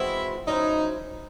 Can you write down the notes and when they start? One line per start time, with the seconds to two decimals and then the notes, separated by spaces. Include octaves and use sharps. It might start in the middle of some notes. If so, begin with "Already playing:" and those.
Already playing: E3 G#3 C4 E4 F#4
0.47 F#3 C#4 D#4 E4 C5